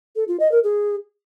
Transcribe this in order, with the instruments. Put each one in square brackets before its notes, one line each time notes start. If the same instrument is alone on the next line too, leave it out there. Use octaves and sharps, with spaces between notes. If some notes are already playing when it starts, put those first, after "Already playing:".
[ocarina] A4
F4
D#5
A#4
G#4